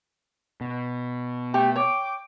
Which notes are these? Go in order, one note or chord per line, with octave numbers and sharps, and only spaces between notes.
B2
A3 G4
C#5 G5 D6